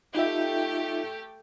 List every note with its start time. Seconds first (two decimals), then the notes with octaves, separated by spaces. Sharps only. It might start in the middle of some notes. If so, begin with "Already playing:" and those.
0.15 A3 D#4 F4 G4 E5